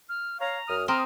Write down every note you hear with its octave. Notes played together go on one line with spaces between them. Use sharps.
F6
C#5 F5 A#5
F#2 D#6 F6
C4 A#5 D#6 F6